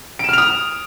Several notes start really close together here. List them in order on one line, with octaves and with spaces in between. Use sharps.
D7 E7 F6 F7 D#6